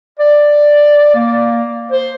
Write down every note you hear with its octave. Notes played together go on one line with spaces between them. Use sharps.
D5
A#3
C5